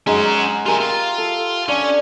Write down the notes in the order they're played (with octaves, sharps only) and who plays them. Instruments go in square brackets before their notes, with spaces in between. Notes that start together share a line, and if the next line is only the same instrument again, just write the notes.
[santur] G#3 D#4 G#4 [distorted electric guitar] C#4 F#4
[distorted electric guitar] F4 G#5 [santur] G4 A#4 E5
[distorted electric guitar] F4
[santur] A4
[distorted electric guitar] C#4 [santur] D4